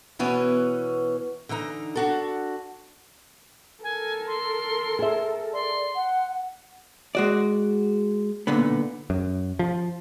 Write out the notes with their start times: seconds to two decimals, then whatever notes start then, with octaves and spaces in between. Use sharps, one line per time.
0.19 B2 E3 B3 C#4
1.49 D3 E3 D#4 A#5
1.95 D4 F#4 A4
3.83 A4 A#4 G#5
4.27 C6
4.99 G#4 E5
5.53 D5 C6
5.95 F#5
7.15 G#3 F#4 D5
8.47 B1 A#2 D3 B3
9.10 F#2
9.59 F3